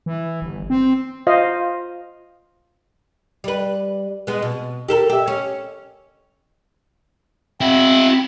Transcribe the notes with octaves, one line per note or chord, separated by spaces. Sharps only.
E3
G1
C4
F4 C5 D#5 F5
G3 B4
G#3 B3
B2
G4 A4 A#4
G4 E5
C#4
C4 E4 F#4